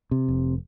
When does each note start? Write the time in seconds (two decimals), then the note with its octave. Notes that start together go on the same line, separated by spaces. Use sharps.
0.11 C3
0.28 F1